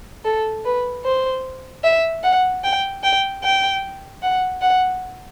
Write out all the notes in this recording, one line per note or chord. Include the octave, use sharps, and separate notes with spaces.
A4
B4
C5
E5
F#5
G5
G5
G5
F#5
F#5